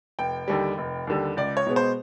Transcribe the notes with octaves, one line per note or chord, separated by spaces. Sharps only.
F1 G5
D#2 D3 G3
F1
D#2 D3 G3
C#2 D5
C#5
B2 G#3 B3
C5